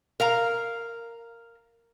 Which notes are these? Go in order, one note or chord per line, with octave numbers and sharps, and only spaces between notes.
A#4 F5 A#5